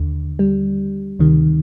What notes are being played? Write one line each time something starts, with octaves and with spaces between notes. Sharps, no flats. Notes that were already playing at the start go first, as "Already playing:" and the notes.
Already playing: D#2 D3
G3
D2 C3 D#3